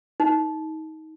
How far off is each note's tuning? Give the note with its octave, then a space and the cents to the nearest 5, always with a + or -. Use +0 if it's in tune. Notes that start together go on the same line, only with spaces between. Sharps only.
D#4 +25